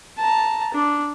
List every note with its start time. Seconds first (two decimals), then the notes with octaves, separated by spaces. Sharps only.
0.18 A5 A#5
0.74 D4